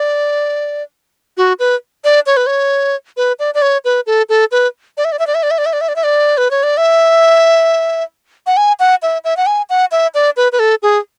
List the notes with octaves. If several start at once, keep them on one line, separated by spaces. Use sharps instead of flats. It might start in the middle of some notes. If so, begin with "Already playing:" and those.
Already playing: D5
F#4
B4
D5
C#5
B4
C#5
B4
D5
D5
C#5
B4
A4
A4
B4
D5
E5
D5
E5
D5
E5
D5
E5
D5
E5
D5
E5
D5
E5
D5
B4
C#5
D5
E5
F#5
G#5
F#5
E5
E5
F#5
G#5
F#5
E5
D5
B4
B4
A4
G#4